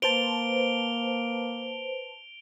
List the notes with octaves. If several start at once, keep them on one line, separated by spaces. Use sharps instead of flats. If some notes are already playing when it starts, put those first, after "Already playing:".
A#3 B4 C5 A5 D7 F7 G7